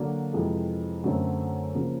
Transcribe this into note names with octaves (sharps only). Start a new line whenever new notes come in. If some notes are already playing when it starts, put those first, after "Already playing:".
Already playing: D3 F#3 A#3 D4
F2 C3 E3 G#3
F#2 D3 F#3 A3 C4
C#3 F3 A#3